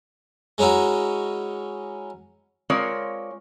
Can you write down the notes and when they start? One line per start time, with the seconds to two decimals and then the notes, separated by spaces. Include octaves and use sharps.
0.58 G#3 C#4 D#4 E4 F#4
2.70 G#3 C4 F4 A#4 C#5 D5